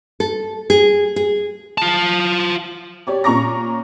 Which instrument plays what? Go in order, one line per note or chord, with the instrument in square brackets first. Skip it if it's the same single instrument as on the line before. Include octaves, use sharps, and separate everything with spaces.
[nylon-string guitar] A4
G#4
G#4
[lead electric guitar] F4 A5
[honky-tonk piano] G4 C#5 D5
A#2 C#4 A#5 C#6 D6 A#6